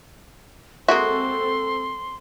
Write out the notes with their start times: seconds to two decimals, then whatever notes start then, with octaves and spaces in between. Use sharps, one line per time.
0.88 G#3 A#3 C4 F#4 A4 E5 C6